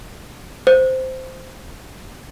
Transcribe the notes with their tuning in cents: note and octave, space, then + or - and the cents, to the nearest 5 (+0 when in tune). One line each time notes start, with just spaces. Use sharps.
C5 -10